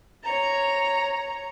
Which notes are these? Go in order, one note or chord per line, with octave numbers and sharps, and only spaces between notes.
C#5 A#5